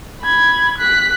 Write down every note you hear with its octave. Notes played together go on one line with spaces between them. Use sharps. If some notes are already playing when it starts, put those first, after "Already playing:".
B5 G#6
F#6 B6